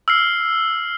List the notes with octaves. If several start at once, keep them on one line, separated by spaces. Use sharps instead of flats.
E6 F6 C7